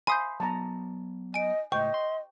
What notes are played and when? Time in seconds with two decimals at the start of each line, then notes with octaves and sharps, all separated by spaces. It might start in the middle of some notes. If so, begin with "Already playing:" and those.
0.07 G#5 B5 C6 D#6 G6
0.40 F#3 B3 A5 A#5
1.34 D#5 G#5 D7
1.72 C#2 A2 D#5 G5 C#6
1.94 C6